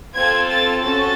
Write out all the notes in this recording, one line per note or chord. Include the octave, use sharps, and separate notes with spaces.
C4 F4 A4 G#6
A6
C#4 F#4 A4 A6